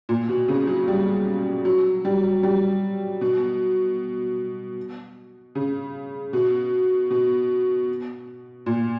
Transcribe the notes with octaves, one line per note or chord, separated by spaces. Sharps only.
A#2
B2
C#3
F#3
G3
F#3
G3
G3
B2
C#3
B2
B2
A#2